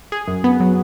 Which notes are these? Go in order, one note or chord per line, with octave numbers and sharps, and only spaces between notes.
G#4
F#2
B3
F#3